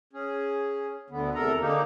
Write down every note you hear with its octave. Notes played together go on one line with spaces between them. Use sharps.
C#4 G#4
D2 D3 B3
E2 C3 A4 A#4 A#5
D3 A#3 D#4 G4